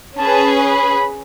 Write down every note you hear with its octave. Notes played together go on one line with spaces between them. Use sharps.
C#4 G#4 B4 A5
B5